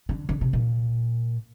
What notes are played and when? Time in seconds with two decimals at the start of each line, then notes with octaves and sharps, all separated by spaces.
0.09 D3
0.29 D3
0.41 C3
0.53 A#2